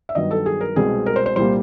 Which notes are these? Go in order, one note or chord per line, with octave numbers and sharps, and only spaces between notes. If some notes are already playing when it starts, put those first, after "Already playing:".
E5
G2 D#3 F#3 B3 D#5
A4
G#4
A#4
C2 B2 G#3 C4 G#4
A#4
C5
C5
C2 A#2 G3 A#3 C5